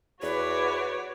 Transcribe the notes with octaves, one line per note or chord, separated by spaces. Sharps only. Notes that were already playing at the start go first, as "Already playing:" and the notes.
E2 F#4 B4 C#5 D5